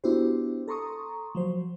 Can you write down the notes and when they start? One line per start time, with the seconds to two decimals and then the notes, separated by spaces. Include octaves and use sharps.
0.04 B3 D4 E4 F#4 G4 C5
0.68 A4 A#5 C6 C#6 D#6
1.35 F3 F#3 C5